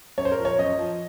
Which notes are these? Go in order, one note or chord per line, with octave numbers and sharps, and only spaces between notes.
F#2 C#5
C5
A#4
F3
C#5
F#2 D#5
F3